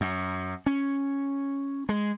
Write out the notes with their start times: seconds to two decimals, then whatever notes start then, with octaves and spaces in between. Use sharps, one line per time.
0.01 F#2
0.66 C#4
1.89 G#3